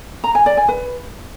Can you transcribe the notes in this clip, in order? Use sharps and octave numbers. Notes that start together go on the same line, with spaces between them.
A#5
G#5
D5
G#5
B4